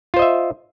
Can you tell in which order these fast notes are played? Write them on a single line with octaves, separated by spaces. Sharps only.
F4 C5 D#5 E5